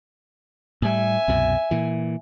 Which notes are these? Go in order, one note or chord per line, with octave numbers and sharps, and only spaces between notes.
A2 G3 E5 G#5
C2 F#2 B2
A#2 E3